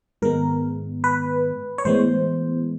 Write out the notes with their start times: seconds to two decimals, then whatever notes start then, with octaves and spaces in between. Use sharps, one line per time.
0.22 G#2 D#3 G#3 B3 A#4
1.04 B4
1.78 C#5
1.85 A2 E3 G#3 B3 C5